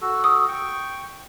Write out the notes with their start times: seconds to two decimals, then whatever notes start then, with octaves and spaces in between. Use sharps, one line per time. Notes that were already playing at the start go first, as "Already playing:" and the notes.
0.01 F#4 A4
0.24 D#6
0.48 G5 C#6